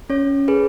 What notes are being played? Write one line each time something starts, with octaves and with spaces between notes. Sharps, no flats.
C#4 C#5
G#4 B4